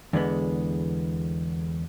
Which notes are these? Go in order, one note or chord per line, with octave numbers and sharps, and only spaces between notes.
E2 D3 G#3 B3